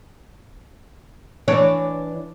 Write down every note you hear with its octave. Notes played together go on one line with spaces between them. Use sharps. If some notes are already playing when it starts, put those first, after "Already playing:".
E3 D4 C#5